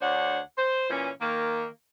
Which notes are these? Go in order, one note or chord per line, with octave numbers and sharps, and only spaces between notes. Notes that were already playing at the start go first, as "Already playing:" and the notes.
D2 D4 C5 C#5 F#5
C5
A#2 E3 C#4
D#3 A#3